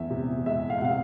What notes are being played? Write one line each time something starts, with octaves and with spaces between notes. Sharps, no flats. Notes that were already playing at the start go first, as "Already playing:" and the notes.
Already playing: E2 E5
C3
G#3 E5
F5
F#5
C3 F5